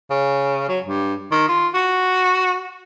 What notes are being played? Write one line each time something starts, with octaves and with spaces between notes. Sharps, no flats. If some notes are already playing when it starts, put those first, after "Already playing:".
C#3
F#3
G2
D#3
F4
F#4